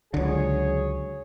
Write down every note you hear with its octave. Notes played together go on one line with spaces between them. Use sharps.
C#2 D3 F#3 G#4 C#5